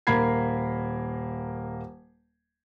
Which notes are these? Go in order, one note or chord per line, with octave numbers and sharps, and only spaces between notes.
D#1 A#3 A#4 B5 G#6 C7